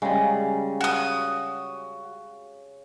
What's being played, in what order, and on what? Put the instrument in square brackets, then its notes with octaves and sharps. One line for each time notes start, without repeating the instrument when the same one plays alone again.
[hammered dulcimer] C#3 [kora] G3 G#3
[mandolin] F#4 D#6